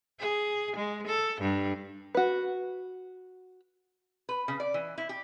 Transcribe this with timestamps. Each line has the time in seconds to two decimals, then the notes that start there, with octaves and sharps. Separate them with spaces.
0.20 G#4
0.77 G#3
1.07 A4
1.41 G2
2.15 F#4 B4
4.29 B4
4.48 C#3
4.60 D5
4.74 E3
4.98 E4
5.09 G4